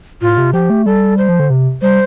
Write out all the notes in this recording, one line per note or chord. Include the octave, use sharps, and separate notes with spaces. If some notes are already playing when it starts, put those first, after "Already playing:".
A2 F4
C3
F3 G4
A3
G3 A4
C5
F3
D3
C3
G3 C5